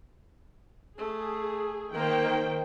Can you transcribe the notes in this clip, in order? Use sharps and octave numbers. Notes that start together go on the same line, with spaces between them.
A3 G#4
D#3 A#3 C5 G5